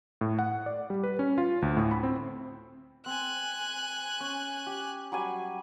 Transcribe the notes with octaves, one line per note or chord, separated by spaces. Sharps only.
A2
F#5
D5
G3
B4
C#4
F4
D2
A2
B5
C4
C4 G#5 F#6
C#4
G4
F#3 G3 G#5